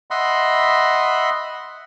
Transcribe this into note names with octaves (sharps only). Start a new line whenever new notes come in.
D#5 E5 F#5 B5 C6